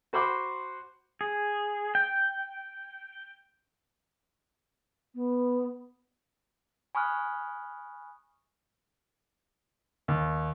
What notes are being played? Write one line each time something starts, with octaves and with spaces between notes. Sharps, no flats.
F#4 C5 B5 C6 D6
G#4
G5
B3
G#5 B5 C#6 D#6 F6 F#6
D#2